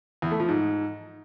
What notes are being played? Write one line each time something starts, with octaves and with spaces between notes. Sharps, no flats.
E2
A3
F3
G#2